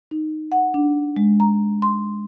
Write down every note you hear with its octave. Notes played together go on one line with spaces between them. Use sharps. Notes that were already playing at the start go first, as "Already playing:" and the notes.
D#4
F#5
D4
G#3
A#5
C6